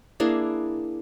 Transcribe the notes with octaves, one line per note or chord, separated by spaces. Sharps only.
A#3 D4 E4 G#4